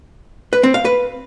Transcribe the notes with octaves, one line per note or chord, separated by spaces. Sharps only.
B4
C4
F5
B4